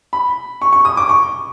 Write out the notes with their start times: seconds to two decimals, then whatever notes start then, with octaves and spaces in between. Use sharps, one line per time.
0.13 B5
0.62 C#6
0.73 C#6
0.85 D#6
0.97 D6
1.09 C#6